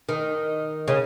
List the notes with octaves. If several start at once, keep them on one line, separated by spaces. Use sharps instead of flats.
D#3
C#3